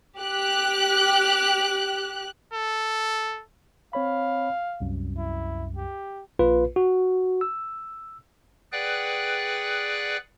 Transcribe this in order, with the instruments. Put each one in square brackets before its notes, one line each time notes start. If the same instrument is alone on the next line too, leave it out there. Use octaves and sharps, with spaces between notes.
[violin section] G4 F#6
[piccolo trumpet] A4
[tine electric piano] C4 C#5 B5 [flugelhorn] F5
[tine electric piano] C2 F#2
[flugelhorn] E4
G4
[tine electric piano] A#1 A#3 F4 B4
F#4
E6
[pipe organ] G#4 B4 D5 F#5 G5 F#6